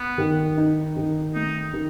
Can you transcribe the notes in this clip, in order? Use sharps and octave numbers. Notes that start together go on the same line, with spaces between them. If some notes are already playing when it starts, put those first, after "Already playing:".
Already playing: B3
D#3
D#4
D#3
A3 D#4
D#3